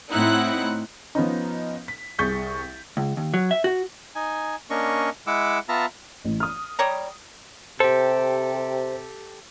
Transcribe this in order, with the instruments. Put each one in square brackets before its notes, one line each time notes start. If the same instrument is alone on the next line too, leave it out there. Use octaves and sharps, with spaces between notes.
[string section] A2 C4 D#4 E4 F#5 F#6
[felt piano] F3 B3 C#4 D#4
B6
C2 G#4 C#6 G6 A6 B6
[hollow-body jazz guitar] C#2
D#2
F#3
E5
F#4
[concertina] D#4 G#5
A#3 C#4 D4 D#5 C#6
G#3 E4 F#5 D6 E6
B3 F4 E5 A5 A#5
[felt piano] A1
D#6 F6
[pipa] G3 C#5 A#5
[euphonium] C3 [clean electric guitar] G4 A4 [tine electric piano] C5